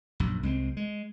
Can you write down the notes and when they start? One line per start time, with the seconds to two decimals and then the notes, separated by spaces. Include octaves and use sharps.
0.20 A#1 F#2
0.43 C2 G#3 C4
0.77 G#3